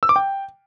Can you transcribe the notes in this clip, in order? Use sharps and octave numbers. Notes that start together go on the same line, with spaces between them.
E6
D6
G5